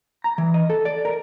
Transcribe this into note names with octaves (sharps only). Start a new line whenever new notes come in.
A#5
E3
D#5
A4
D5
A#4